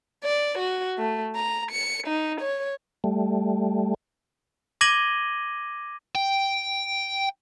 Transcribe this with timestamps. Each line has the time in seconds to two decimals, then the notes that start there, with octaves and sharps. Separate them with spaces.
0.24 D5
0.59 F#4
0.99 A3
1.36 A#5
1.72 C#7
2.07 D#4
2.41 C#5
3.04 G3 A3
4.81 D6 G#6 A#6 D#7 F#7 G7
6.15 G5